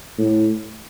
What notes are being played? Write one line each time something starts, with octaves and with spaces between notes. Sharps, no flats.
A2